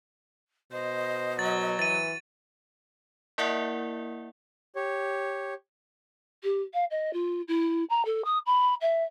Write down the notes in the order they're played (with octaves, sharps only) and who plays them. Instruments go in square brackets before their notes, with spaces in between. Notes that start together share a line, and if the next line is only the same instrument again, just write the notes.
[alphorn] B2 [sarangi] C5 [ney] D#5
[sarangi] F#3 [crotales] A6
[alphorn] E3 [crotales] A6 D#7
[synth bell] A#3 E4 A#4 D5 E5 F#5
[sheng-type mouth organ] G4 C#5
[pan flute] G4
F5
D#5
F4
E4
A#5
A4
D#6
B5
E5